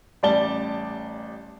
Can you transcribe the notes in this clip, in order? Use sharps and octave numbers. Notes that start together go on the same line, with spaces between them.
A1 G3 D5 A5 G7